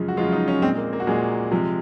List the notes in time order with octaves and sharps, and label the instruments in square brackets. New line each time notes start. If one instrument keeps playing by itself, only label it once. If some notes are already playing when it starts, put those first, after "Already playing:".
Already playing: [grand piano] F#2 C#3 F3 G#3
F#4
F#2 C#3 F3 G#3 F4
D#4
C#4
A#2 G#3 C4
A#3
A#3
F#4
A#2 G#3 G#4
C3 F3 G#3